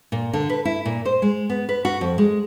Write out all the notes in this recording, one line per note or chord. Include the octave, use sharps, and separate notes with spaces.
A#2
D3
B4
E4
A#2
C5
G#3
B3
B4
F#4
F2
G#3